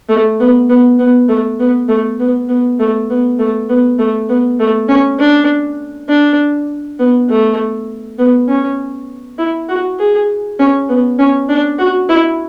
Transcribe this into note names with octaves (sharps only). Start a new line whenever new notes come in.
A3
B3
B3
B3
A3
B3
A3
B3
B3
A3
B3
A3
B3
A3
B3
A3
C#4
D4
D4
B3
A3
B3
C#4
E4
F#4
G#4
C#4
B3
C#4
D4
F#4
E4